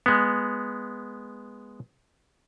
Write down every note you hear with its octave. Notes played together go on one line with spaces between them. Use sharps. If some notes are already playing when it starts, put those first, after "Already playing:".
G#3 B3